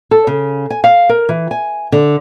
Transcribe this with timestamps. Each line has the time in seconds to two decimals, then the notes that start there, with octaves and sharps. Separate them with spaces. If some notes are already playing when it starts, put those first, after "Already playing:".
0.11 A4
0.27 C#3
0.70 G#5
0.84 F5
1.09 A#4
1.29 E3
1.51 G#5
1.92 D3